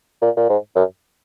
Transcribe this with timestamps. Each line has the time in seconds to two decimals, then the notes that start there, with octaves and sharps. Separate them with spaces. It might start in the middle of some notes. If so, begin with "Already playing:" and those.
0.22 A#2
0.37 A#2
0.49 G#2
0.75 F#2